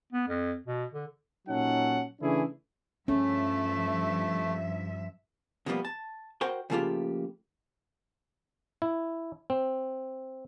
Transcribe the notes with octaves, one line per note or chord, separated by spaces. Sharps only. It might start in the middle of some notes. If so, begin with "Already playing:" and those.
B3
F2
B2
D3
A#2 F#3 C#4 D#4 A4 F#5
C#3 E3 A3 D4 E4 G#4
G2 F3 A3 C#4 E5
B2 D3 F3 G3 A#3 B3
A5
F#4 A#4 C5 F#5 G5
C#3 F3 A3 A#3 F4 G4
E4
C4